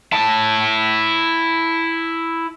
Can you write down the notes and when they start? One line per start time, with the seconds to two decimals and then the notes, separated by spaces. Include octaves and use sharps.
0.12 E4 A5